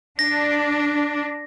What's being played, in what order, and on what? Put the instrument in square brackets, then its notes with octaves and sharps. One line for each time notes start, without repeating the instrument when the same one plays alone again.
[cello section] D4 [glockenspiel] A#6